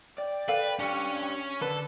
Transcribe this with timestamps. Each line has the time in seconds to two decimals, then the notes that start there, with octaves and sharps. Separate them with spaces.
0.18 D5 G5
0.48 A4 B4 F5
0.79 C#4 D4 G4
1.61 D3 A4 B4